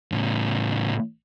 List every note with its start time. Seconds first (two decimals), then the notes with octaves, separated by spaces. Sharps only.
0.12 A2 C#3